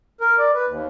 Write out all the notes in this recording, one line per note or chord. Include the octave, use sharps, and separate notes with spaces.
A#4
D5
B4
D#2